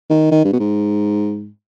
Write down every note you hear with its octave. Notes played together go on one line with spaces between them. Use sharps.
D#3
D#3
G2
B2
G#2